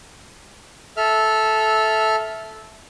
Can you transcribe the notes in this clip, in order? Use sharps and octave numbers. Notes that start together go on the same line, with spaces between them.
A4 E5 F6